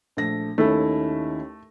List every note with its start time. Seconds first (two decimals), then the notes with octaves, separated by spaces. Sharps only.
0.17 A#1 A3 A#6
0.58 D#2 A3 C#4 D#4 E4